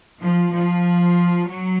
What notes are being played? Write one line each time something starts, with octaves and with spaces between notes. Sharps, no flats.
F3
F3
F#3